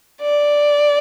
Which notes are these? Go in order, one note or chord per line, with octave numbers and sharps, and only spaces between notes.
D5